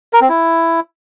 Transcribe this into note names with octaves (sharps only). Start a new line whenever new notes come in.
A#4
C4
E4